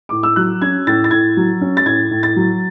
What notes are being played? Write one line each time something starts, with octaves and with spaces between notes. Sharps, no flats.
A2 D6
E6
F#3 F#6
C#4 G#6
A2 A6
A6
A2 G#6
F#3
C#4
A6
A2 G#6
A2
A6
F#3